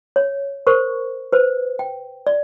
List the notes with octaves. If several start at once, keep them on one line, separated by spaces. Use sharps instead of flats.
C#5
A#4 C5 C#6
B4 C5
G5
D5